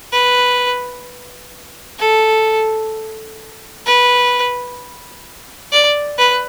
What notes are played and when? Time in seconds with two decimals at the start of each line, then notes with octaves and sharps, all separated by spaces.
0.12 B4
1.99 A4
3.86 B4
5.72 D5
6.18 B4